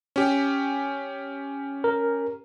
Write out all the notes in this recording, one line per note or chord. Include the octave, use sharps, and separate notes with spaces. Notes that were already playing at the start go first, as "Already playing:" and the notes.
C#4 G4
A#4